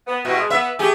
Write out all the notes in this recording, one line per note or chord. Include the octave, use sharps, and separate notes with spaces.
B3
B2 G3 E4 F#4
G#3
B3 E5
A3 G4 G#4